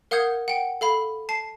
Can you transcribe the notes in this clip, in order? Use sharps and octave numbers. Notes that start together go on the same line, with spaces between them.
A#4 F5 F#5 D#6 G6 G#6
F#5 G5
A4 F5 B5
A5 C7